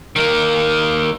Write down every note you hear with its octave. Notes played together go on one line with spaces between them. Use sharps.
D#3 A#3